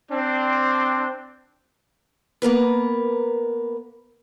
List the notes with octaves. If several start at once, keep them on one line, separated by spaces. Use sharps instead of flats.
C4 D4
A#3 B3 A#4 B4